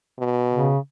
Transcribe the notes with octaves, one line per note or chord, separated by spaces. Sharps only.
B2
C#3